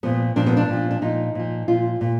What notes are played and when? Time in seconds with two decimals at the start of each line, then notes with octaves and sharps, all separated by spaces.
0.03 A#2 F3 B3
0.36 A#2 F3 D4
0.46 B3
0.57 D4
0.69 A#2 F3
0.91 D4
1.02 A#2 F3 D#4
1.35 A#2 F3
1.68 A#2 F3 F4
2.01 A#2